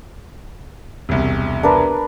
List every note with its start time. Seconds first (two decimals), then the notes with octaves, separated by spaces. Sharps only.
1.09 E1 C2
1.63 D4 A#4 B4